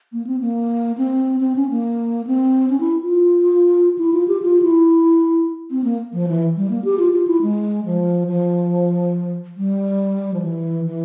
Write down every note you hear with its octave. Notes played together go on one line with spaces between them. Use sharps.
A#3
C4
A#3
C4
C4
C#4
A#3
C4
C#4
E4
F4
E4
F4
G4
F4
E4
C4
A#3
F3
E3
G3
A#3
G4
F4
F4
E4
G#3
F3
F3
G3
F3
E3
E3